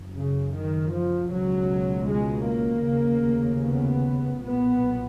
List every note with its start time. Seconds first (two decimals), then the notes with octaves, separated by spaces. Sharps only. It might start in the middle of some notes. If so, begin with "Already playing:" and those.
Already playing: F#1 F#2
0.14 C#3
0.54 D#3
0.92 F3
1.31 C#2 B2 F#3
2.08 G#3
2.48 A#3
2.86 F1 D#2 C#3
3.64 B3
4.41 B1 A#2 B3